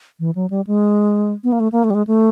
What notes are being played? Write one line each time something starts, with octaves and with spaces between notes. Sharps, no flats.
E3
F#3
G3
G#3
B3
A#3
A3
A#3
A3
G3
G#3
A3